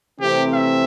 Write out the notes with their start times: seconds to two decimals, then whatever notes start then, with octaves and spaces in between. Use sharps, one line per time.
0.20 C3 E3 A3 C4 G4
0.54 E5